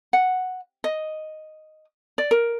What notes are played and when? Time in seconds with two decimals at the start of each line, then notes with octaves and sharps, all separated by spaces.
0.13 F#5
0.84 D#5
2.18 D5
2.31 A#4